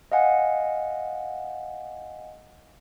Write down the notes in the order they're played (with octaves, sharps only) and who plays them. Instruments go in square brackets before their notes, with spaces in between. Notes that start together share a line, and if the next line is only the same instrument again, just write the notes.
[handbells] D#5 F5 F#5 G#5